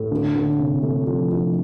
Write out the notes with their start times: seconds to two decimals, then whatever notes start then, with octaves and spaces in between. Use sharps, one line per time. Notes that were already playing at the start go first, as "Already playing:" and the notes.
Already playing: A2 A4
0.11 D2
0.35 D2
0.59 C3
0.83 A3
1.06 F3
1.31 F3